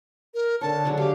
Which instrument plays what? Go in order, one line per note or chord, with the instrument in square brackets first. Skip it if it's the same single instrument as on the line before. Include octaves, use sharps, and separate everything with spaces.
[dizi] A#4
[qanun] D3 C#5 [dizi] A5
[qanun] D3 F#3 G#3
[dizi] G4 [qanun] F5 D6